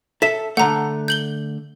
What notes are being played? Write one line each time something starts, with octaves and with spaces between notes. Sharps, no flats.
A4 E5 B6 E7
D3 A3 F#5 A#5
G6 F#7 G7